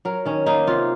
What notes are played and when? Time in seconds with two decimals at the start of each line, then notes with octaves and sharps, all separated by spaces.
0.05 F#3 A#4
0.25 D#3 C#4
0.46 A#3 D#4
0.67 C3 F4